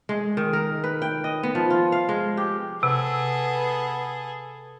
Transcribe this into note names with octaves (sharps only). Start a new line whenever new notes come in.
G#3
D#3
A#4
B4
G5
D#5
B3
F3
F4
F5
G#3
G4
C3 B3 G#4 A4